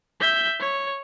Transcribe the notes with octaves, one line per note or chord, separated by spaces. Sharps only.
E5 G6
C#5